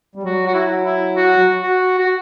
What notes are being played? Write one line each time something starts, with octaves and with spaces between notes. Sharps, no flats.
G3
F#3 F#4
F#4
E4
E4
F#4
F#4
F#4